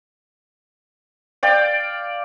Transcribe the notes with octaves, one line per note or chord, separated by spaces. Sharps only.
D5 F5 G5